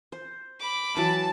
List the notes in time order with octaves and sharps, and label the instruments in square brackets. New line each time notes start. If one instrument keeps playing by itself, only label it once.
[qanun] C5
[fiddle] B5 D6
[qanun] E3 F#3 [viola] A5